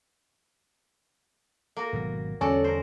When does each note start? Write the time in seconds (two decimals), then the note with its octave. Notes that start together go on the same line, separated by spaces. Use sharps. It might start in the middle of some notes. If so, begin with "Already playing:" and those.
1.77 A#3 F#4 A#4
1.93 G#1 B2 F#3
2.41 E2 D3 G3 C#4 F#4 A4 D5
2.64 A#4 C5